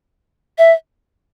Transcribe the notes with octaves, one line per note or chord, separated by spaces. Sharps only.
E5